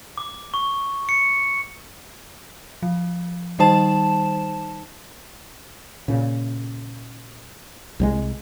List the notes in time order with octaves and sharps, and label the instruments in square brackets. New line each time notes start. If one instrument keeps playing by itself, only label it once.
[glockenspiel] D6
C#6
C#7
[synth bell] F3
D#3 G3 D#4 C5 A5 E7
[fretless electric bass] A#2 C#3
C2 F#3 G#3